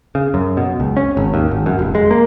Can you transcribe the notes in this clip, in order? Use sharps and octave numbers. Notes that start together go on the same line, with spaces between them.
C#3
F#2
B2
C#2
C#4
G#1
D#2
G#1
F#2
F1
G#3
A#3